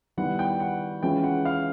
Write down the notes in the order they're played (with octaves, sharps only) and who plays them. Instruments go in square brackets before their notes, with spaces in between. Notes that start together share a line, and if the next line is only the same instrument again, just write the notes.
[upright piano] D#3 G3 B3 E4 [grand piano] F#5
[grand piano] G5
F#5
[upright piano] E3 G#3 C#4 F4 [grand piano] G5
[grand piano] F#5
F5